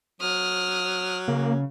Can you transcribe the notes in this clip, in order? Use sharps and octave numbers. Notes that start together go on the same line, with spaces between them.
F#3 D#6 F6
C#3 A#3